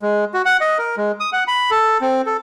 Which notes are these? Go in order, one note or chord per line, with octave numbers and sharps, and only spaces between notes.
G#3
F#4
F#5
D#5
A#4
G#3
D#6
F#5
B5
A4
C4
A4